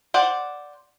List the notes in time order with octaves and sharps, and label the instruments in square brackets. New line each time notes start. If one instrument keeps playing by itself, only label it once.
[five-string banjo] C5 D5 F#5